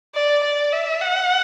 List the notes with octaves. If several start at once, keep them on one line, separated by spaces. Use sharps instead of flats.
D5
D5
E5
F#5